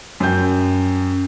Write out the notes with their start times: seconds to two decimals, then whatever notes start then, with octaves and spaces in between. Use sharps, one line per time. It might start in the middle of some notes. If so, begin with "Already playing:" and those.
0.20 F#2 G5 G6